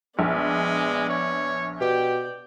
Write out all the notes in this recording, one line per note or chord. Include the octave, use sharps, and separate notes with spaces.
A#1 G#3 B3 D5
C#5
B2 G4 D5 G5